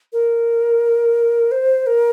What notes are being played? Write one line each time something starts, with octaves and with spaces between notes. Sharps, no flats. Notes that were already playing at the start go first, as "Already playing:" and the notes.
A#4
C5
A#4